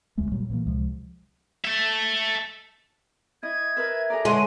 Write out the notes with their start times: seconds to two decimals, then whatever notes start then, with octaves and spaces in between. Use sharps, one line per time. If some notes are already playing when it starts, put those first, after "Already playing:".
0.17 E1 D2 G#3 A3
0.32 A#2 F#3 G3
0.50 A#2 E3 A#3
0.66 C#2 C3 F3 G#3
1.65 A4 E5
3.43 E4 D#5 G#6
3.77 A#4 B4 E5
4.10 G#4 A4 D5 A#5
4.25 D3 G#3 C#5 F#5 D#7